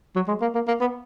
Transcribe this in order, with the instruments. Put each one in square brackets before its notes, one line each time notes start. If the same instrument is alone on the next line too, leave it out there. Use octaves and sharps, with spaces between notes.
[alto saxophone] F#3
G#3
A#3
A#3
A#3
B3